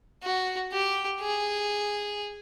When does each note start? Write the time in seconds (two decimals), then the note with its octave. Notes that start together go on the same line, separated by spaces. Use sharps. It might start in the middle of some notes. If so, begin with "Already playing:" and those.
0.23 F#4
0.72 G4
1.21 G#4